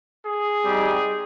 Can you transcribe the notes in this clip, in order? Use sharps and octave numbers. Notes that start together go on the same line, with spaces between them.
G#4
G3 C4 D#4 G4